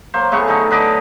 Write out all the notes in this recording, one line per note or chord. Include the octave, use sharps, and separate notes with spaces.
F#3 A#3 C5
A2 C#3 B3 C#6
D3 D#4 A4
D3 B4 D#5 D6